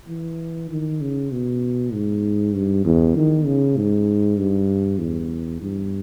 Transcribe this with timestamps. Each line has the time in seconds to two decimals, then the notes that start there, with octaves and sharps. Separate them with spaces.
0.08 E3
0.70 D#3
1.01 C#3
1.32 B2
1.93 G#2
2.55 G2
2.85 E2
3.16 D#3
3.46 C#3
3.77 G#2
4.38 G2
4.99 E2
5.61 G2